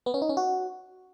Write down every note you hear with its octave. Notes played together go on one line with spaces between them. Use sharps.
B3
C#4
D#4
C#4
F#4